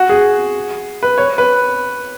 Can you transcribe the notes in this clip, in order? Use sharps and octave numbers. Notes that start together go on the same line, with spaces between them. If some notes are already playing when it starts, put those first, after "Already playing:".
Already playing: F#4
G#4
B4
C#5
B4